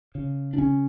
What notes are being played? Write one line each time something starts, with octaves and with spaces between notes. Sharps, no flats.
C#3
D4
C#3 C#4